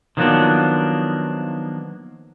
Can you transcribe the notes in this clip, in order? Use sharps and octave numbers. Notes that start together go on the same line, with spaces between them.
D#3 F3 F#3 A#3 B3 D4